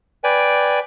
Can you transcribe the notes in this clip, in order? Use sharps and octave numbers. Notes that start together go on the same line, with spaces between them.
B4 D5 G5 G#5